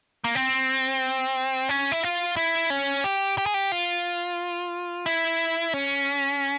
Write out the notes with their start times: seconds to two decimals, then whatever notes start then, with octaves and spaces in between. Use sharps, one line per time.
0.24 A#3
0.35 C4
1.69 C#4
1.92 E4
2.03 F4
2.36 E4
2.70 C#4
3.04 G4
3.38 G4
3.46 G#4
3.54 G4
3.72 F4
5.06 E4
5.74 C#4